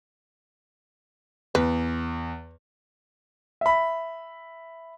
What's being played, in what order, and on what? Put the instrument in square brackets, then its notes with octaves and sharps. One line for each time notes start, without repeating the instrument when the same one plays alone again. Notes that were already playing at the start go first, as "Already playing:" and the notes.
[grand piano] E2 [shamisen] B4
[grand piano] E5 B5